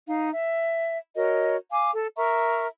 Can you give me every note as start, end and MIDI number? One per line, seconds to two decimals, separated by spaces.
0.08 0.30 63
0.08 0.30 77
0.32 0.97 76
1.16 1.56 66
1.16 1.56 70
1.16 1.56 73
1.16 1.56 75
1.71 1.91 77
1.71 1.91 80
1.71 1.91 86
1.92 2.08 69
2.17 2.66 70
2.17 2.66 76
2.17 2.66 82
2.17 2.66 85